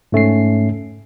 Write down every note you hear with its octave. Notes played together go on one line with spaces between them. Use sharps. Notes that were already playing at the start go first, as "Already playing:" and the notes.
G#2 A3 C#4 C7